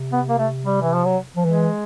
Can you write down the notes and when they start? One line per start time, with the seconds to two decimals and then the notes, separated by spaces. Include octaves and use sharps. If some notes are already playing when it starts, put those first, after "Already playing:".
Already playing: C3
0.12 B3
0.29 A#3
0.39 A3
0.66 G3
0.81 E3
0.93 F3
1.05 F#3
1.36 F3
1.45 E3 G#3